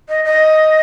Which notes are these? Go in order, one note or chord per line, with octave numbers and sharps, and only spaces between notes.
D#5
D#5